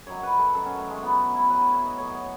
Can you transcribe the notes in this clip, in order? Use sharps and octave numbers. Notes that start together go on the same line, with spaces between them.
F#2 D#3 F#3 C#5
B4
A4
F#2 D#3 F#3 A4
C#4
A3
G#3
A2 F#3 B3
E4
A2 F#3 B4
C#5
E5
D#5
A2 F#3 C#5
C#5